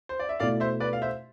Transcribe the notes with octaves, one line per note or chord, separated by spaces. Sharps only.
C5
D5
E5
B2 A3 E4 D5 F5
C5 E5
B4 D5
F5
C5 E5